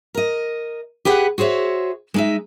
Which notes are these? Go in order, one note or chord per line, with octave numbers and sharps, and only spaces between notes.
A#4 D#5
G4 G#4 B4 F#5
F#4 G#4 C5 C#5 E5
G#3 D#4 E5